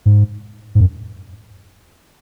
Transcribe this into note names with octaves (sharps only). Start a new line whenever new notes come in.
G#2
G#2
F#2